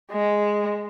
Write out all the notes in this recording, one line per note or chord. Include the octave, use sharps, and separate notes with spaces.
G#3